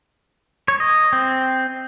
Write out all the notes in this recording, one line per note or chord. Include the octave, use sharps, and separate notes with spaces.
C#5
D#5
C4